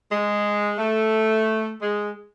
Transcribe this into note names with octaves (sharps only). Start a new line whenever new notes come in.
G#3
A3
G#3